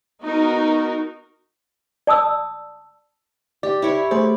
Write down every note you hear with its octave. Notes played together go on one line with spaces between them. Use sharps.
B3 D#4 F#4 A#4
D5 A5 D#6 E6
G4 D5
E4 C#5
A3 G#4 C5 D5